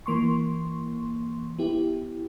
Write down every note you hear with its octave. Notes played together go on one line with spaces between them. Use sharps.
E3 A#3 C6 C#6
B3 E4 G4